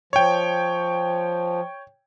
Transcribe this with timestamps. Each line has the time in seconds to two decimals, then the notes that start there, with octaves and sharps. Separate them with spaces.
0.13 F3 C#5 G5